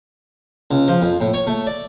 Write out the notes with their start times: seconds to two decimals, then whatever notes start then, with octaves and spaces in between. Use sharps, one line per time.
0.71 C#2
0.88 F3
1.02 F2
1.21 A2
1.34 C#5
1.47 A3
1.67 D5